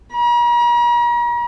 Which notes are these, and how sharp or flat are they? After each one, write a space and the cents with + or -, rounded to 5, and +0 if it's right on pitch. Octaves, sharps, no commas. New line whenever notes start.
A#5 +45